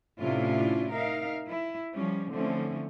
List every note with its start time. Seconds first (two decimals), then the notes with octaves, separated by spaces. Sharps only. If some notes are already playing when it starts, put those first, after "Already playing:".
0.19 A2 C3 C#4 D4 E4 F4
0.91 D#4 A#4 E5 F5
1.48 E4
1.93 F3 G3 C#4
2.32 D3 E3 F3 A3 C4 C#4